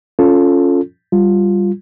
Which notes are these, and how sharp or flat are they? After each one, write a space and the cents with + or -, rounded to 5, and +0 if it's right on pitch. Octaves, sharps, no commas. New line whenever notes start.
C#4 +0 F4 +0 A4 +0
G3 +0 F4 +0